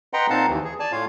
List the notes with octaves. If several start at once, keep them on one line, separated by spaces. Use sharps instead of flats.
B4 D#5 F#5 G5 A#5 C6
A#2 C4 D#4 F5 F#5 A5
D#2 E3
G#4
D5 G#5 A5
A2 F4 C#5 F5